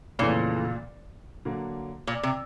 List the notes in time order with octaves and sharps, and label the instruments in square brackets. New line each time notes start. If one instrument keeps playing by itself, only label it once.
[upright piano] F2 C#3 E3 A3 [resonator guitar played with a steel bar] A#2
[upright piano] D3 F#3 A#3
[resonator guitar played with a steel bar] A#2
C3